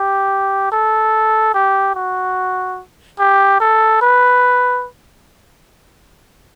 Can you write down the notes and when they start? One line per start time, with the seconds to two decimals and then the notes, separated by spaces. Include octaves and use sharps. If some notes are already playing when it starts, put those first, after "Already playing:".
Already playing: G4
0.72 A4
1.54 G4
1.95 F#4
3.19 G4
3.60 A4
4.01 B4